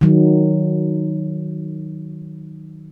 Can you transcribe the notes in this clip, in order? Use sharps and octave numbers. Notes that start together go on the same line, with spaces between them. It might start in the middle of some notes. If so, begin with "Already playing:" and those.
D#3 F#3